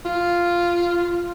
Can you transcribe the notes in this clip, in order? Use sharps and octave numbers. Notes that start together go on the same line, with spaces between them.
F4